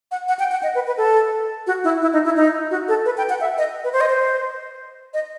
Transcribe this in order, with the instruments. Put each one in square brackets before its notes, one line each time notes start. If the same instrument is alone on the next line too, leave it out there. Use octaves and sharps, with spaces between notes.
[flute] F#5
F#5
G5
F#5
D#5
B4
B4
A4
F#4
E4
E4
D#4
E4
D#4
F#4
A4
B4
G5
F#5
E5
D#5
B4
C5
D#5
C5
D#5